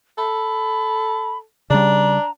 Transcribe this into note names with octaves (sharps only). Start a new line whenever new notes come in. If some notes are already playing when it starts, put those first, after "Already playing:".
A4 B5
C#3 G3 D4 A#5